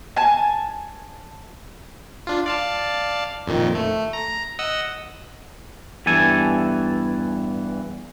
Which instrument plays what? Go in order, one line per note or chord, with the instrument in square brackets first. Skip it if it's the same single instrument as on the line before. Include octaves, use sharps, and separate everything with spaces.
[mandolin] G#5 A5
[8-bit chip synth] D4 F4
D5 F5 A5
F2 A#2 D#3
A3
A#5 A#6
D#5 F#5 E6
[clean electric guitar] E2 G2 E3 A4 G#5